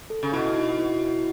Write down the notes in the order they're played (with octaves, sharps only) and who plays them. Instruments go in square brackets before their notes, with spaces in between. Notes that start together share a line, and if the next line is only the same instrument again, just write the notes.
[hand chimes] A4
[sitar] C#3
[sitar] B2 [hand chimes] E4
[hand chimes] D#4
F#4
E4
E4